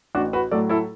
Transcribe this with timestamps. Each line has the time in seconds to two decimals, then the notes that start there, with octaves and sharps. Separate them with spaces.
0.15 A1 D4 F#4
0.33 F#4 B4
0.51 A2 F#3 A4 D5
0.69 E4 A4